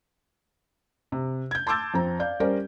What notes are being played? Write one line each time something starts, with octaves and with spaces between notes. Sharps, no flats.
C3
G6 G#6
A5 C6 D6 E6 G6 A6
F2 C4 A#5
D5 F5 G6
G3 C#4 A#4 C5 D5